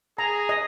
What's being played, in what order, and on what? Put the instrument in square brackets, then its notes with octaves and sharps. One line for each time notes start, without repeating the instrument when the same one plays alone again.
[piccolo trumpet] G#4 [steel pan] A#5
[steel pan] D#5